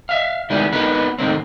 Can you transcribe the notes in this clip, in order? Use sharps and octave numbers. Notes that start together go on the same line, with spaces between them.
E5 F5
D#3 G3 G#3 B3 E4
A#3 B3 D#4 F#4 A#4 B4
A2 D#3 A#3 C4